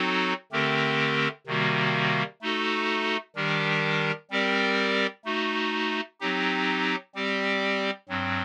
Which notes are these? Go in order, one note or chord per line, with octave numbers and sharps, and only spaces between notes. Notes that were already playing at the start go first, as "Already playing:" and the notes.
Already playing: F#3 C4 D#4 F#4 A4
D3 A3 C4 G4 A#4
C3 D#3 G3 A#3 F#4
A3 D#4 F#4 A4
D#3 G3 D4 G4 A#4
G3 C4 G4 A#4 D5
A3 D#4 F#4
F#3 C4 D#4 G4
G3 C4 G4 D5
G2 F#3 C4